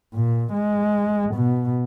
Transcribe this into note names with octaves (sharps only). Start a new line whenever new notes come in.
A#2
G#3
B2